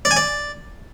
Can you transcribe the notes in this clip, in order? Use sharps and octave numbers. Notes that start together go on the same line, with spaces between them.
D5
G#5
D5